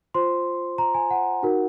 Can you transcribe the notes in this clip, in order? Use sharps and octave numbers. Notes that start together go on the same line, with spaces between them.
F4 C5 C6
A#5
G#5
F#5
D#4 F#4 A#4